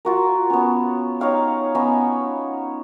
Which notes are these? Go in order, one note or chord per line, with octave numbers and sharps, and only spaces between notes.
F4 F#4 A#4
B3 C#4
D#4 C#5 F5 G5
B3 C#4 D#4